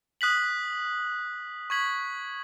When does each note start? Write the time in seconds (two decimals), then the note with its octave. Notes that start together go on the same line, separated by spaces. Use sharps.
0.21 D#6 F#6 B6 F#7
1.70 C#6 G#6 B6 F#7